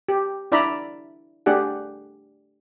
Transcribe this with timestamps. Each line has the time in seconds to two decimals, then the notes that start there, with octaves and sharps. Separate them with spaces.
0.08 G4
0.52 D4 E4 D5 E5 A#5 B5
1.46 A3 D4 G4 G#4 F#5